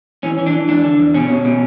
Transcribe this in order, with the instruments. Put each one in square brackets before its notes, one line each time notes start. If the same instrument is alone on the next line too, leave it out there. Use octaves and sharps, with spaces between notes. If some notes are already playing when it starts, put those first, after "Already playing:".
[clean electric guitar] E3 C#4
E3
D4
E3
E2 D4
D3
E2
B2 C#4
B2
B2